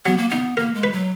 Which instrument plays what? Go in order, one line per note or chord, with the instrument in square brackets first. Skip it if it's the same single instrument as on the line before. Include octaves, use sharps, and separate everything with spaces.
[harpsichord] F#3 [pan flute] B3
[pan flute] A#3
[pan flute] B3 [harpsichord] D#4
[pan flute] A#3 [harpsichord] A#4
[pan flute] G#3
[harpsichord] B4
[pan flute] F#3